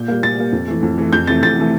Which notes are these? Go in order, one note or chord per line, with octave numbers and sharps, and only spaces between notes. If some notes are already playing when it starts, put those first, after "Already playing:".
Already playing: A#2 G6
G3 A#3
A#2 A6
G3 A#3
F2
E3 A3
F2
E3 A3
F2 G6
C3 E3 A3 A6
F2 A6
C3 E3 A3